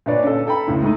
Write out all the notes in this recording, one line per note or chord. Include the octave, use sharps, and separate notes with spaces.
A#2 D3 D4 B4 C#5 D5
C#4 A4
A4 G5 A#5 B5
C#2 A2 D3
G#3 A3 D#4